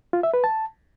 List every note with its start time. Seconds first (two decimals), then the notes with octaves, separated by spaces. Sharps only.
0.13 F4
0.23 E5
0.34 B4
0.44 A5